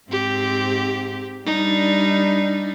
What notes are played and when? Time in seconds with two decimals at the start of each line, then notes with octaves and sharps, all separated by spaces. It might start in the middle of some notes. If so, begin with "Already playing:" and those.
0.10 G#2 C4 G4
1.46 G3 D4 D#4